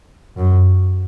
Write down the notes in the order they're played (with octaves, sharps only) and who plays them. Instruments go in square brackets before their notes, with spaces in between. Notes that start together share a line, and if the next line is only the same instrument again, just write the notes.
[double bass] F#2